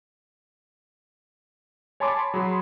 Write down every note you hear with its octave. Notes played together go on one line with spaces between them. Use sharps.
C#5 G#5 A5 B5 C6 D6
F#3 G#4 B5 C6